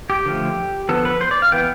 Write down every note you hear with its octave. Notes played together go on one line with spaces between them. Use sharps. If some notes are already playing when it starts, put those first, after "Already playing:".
G4
D3 F3 A3
D3 F3 B3 A4
B4
C5
D5
F5
E3 B3 G5